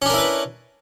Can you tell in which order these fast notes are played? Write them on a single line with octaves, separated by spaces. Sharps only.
C#4 D4 A#4 E4 B4